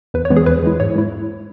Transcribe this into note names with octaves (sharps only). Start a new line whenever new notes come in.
E2 B4
C#5
E3 G#3 B3
G#4
E2 B4
E3 G#3 E4
G#2 C#5
G#3 E4